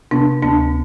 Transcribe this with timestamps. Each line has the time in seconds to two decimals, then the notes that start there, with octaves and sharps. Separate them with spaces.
0.11 C3 B3 D4
0.43 D2 B3 D4